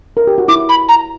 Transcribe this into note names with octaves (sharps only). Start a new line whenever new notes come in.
A#4
G4
F#4
E4 D6
B5
A#5